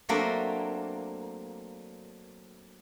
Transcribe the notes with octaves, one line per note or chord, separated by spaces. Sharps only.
F#3 A3 A#3 C4 D4